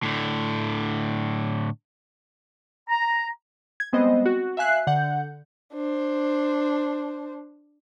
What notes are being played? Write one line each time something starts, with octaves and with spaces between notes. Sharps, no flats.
A2 D3
A#5
G#6
G3 G#3 B3 C4 C5 D#5
F#4
E5 F5 G#5 F#6 C7
D3 F#5 G6
D4 C5